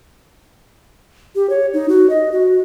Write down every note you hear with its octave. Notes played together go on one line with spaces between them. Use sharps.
G4
C#5
D#4
F#4
D#5
F#4